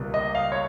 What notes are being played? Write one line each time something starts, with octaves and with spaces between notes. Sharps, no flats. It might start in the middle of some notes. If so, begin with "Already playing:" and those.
Already playing: C#2 C3 G3 A#3
D#5
F5
C#5